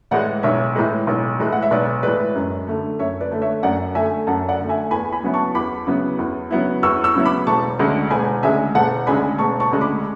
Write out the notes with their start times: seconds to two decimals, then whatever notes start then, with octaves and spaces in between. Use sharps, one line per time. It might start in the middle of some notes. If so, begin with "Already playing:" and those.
0.11 A2 E3 G#3 D5 F#5
0.43 B1 C#5 E5
0.75 A2 E3 G#3
1.07 B1
1.40 A2 E3 G#3
1.52 F#5
1.62 E5
1.71 B1 B4 D5
2.03 A2 E3 G#3 B4 D5
2.35 F#2
2.67 D3 A3
2.99 F#2 C#5 E5
3.21 B4 D5
3.31 D3 A3
3.42 C#5 E5
3.63 F#2 D5 F#5
3.95 D3 A3 E5 G#5
4.27 F#2 F#5 A5
4.48 D5 F#5
4.59 D3 A3
4.69 E5 G#5
4.91 E2 G#5 B5
5.12 G#5 B5
5.23 C#3 F#3 B3 E4
5.34 A5 C#6
5.55 E2 B5 D6
5.87 C#3 F#3 B3 E4
6.19 E2
6.51 C#3 F#3 B3 E4
6.83 E2 C#6 E6
7.04 C#6 E6
7.15 C#3 F#3 B3 E4
7.25 B5 D6
7.47 E1 A5 C#6
7.79 D2 C#3 G#3 D4
8.11 E1 G#5 B5
8.43 D2 C#3 G#3 D4 E5 G#5
8.75 E1 F#5 A5
9.07 D2 C#3 G#3 D4 G#5 B5
9.38 E1 A5 C#6
9.60 A5 C#6
9.71 D2 C#3 G#3 D4
9.81 B5 D6